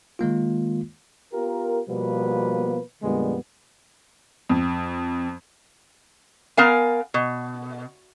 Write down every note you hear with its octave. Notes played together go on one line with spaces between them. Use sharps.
D#3 G#3 A#3 F4
B3 F4 G4 A#4
B2 F3 G3 A#3 B3 B4
F2 A#2 D3 G3 G#3 B3
F2
B3 A#4 F5 G#5
B2